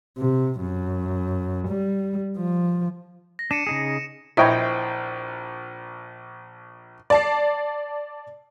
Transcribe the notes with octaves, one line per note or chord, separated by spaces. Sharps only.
C3
F#2
G3
F3
A#6
D4 C#7 D#7 E7
C#3 D#4 G#4
A#1 E4 C5 C#5 D#5 E5 G5 B5
D5 A5 C7